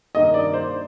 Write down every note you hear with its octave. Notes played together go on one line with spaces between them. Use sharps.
G2 D#3 A#3 D#4 D#5
D5
C5